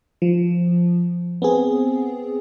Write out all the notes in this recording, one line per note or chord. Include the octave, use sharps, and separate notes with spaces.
F3
B3 C4 G#4